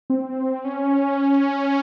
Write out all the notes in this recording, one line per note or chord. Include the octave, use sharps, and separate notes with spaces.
C4
C#4